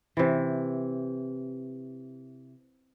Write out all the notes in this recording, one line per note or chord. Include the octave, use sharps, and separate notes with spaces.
C3 E3